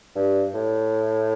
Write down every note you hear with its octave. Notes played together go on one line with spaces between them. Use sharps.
G2
A2